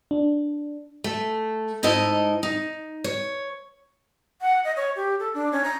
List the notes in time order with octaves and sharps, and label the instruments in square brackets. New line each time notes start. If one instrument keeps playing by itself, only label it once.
[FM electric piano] D4
[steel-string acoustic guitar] A3
G#2 D#4 E4 D#5 A5
D#4
C#5
[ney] F#5
D#5
C#5
G4
A4
D4
C#4
A#5